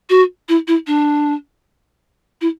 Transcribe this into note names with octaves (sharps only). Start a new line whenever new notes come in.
F#4
E4
E4
D4
E4